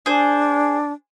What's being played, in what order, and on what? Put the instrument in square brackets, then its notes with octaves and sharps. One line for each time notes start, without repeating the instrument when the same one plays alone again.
[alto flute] D4 [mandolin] G#4 C5